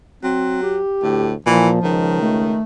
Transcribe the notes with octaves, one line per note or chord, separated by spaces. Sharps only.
F#3 C4
G4
D2 A2
A#2 E3 F3
C#2 D#3
A3